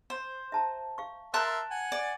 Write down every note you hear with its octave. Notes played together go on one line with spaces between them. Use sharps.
C5
E5 A5 A#5
F5 C#6
A#4 E5 A5 C6 F#6
F#5 G#5
D5